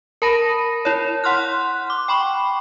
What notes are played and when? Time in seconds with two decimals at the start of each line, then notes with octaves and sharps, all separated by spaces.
0.22 A#4 A5 B5 A#6 D#7
0.85 E4 C#5
1.24 F#5 C6 F6 F#6
1.90 D6
2.08 G5 B5 C#6